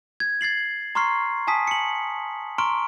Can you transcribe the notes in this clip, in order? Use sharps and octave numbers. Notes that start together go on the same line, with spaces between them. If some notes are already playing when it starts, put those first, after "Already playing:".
G#6
G#6 A6 C7 F#7
A#5 C6 C#6 F6 C7
G#5 A5 D#6 B6
C#7 F#7
A#5 C6 C#6 F6 D7